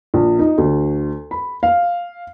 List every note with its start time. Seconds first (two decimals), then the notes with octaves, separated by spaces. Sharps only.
0.14 A#1
0.39 D#4
0.58 D2
1.31 B5
1.63 F5